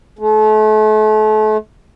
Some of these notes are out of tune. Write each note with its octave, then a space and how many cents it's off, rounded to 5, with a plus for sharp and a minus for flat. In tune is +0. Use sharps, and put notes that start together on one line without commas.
A3 -35